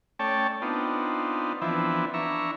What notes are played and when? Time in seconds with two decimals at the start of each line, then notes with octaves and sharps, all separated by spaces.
0.19 A3 C#4 C#5 D5 G5 A5
0.62 B3 C4 D4 D#4 F4
1.62 E3 F3 B3 C4 D4 E4
2.14 D4 E4 E5 A#5 C#6